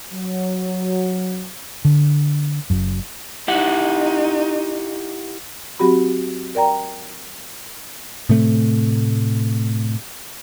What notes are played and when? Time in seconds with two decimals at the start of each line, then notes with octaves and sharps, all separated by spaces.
0.13 F#3
1.85 D3
2.70 F#1 F#2
3.48 D#4 E4 G4 F#5
5.79 F#3 C4 F#4 G4 B5
6.55 A#4 D5 G5 A#5
8.29 A2 C3 A3